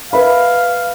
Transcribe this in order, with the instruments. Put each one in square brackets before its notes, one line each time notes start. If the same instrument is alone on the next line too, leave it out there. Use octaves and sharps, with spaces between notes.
[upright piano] B4 E5 B5 [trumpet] F5